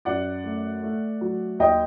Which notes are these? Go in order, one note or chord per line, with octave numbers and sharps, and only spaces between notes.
F#2 D5 F#5
A3
A3
F#3
D#2 D#5 G5